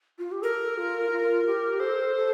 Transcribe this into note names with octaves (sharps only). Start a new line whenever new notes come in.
F4
G4
A4 A#4
F4
F4
G4
A4 C5
A4